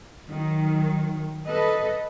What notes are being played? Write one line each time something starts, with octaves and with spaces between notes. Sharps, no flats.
D#3 F#3
A4 B4 D#5